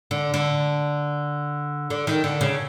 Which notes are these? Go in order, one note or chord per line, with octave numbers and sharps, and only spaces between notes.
D3
D3
D3
D#3
D3
C#3